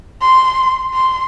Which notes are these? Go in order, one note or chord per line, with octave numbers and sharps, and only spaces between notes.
C6
C6